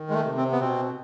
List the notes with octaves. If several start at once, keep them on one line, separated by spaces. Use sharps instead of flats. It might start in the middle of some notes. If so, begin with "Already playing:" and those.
Already playing: D#3
G#3
A3
C3
C4
B3
B2 C4